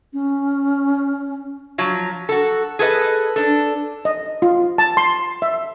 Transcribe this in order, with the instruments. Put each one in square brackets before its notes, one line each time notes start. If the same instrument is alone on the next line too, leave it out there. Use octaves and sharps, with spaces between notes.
[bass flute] C#4
[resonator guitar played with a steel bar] F3 F#3
F#4 A4
G#4 A4 B4 D#5
D4 A4
[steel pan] D#5
F4
A5
C6
E5